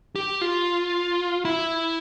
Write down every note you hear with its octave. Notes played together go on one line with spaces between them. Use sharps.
G4
F4
E4